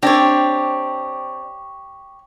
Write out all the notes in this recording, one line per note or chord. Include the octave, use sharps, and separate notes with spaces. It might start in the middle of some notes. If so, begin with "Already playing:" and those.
C4 D4 G4 C#5